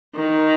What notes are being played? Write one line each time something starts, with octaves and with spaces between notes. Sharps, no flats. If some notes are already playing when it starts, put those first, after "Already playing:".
D#3